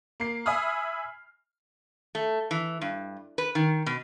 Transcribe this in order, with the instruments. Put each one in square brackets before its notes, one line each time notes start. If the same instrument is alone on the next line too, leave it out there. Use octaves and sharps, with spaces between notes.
[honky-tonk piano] A#3 C7
E5 G#5 B5 D#6 F6
[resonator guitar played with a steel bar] A3
E3
G2
B4
D#3
B2